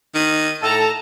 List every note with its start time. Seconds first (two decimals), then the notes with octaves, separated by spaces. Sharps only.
0.15 D#3 D#7
0.63 A2 A4 A5 A#5